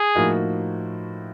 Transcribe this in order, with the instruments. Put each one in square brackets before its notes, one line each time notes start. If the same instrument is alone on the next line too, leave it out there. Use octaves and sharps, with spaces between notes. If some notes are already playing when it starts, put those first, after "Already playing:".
Already playing: [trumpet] G#4
[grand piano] A2 F3 A#3 D#4 F#4